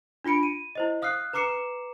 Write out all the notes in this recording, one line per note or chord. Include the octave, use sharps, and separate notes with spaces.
D4 F4 B5 C#7 D7
D#7
E4 C5 D#5
F5 D#6 F6 F#6 C7
B4 A#5 D6 C7 C#7 E7